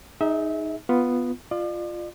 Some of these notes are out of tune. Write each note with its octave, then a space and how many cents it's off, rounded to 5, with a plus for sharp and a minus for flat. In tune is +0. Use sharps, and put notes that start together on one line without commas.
D#4 +0 G#4 +0 E5 -30
B3 +0 F4 +0
F4 +0 D5 +40